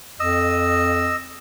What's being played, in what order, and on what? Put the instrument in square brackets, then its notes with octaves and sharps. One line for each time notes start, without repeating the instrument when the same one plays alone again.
[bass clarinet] F2 [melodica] D#5 E6